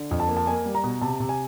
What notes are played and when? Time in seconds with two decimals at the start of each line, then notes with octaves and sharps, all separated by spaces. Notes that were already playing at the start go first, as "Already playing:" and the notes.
Already playing: D3
0.11 F2
0.20 A5
0.29 A#3
0.37 A5
0.47 A#3 G#5
0.66 G3
0.75 A#5
0.84 B2
1.01 C3 A5
1.20 C3
1.29 G#5